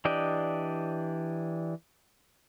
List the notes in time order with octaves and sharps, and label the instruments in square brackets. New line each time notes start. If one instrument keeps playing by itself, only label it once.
[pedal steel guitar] E3 D4 G4 D5 D#5